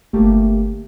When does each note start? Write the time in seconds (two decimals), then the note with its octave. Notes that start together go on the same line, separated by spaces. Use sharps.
0.13 G1 A3 A#3 G4